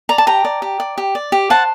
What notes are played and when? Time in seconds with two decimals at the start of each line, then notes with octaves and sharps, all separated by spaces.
0.09 D5 A#5
0.18 A5
0.27 G4 G5 A#5
0.45 D5
0.62 G4
0.80 D5
0.98 G4
1.15 D5
1.32 G4
1.50 C5 F#5 A5